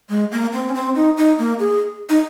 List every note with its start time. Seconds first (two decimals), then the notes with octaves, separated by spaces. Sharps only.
0.10 G#3
0.32 A#3
0.53 C4
0.69 C#4
0.75 C4
0.95 D#4
1.17 D#4
1.39 A#3
1.60 G#4
2.09 D#4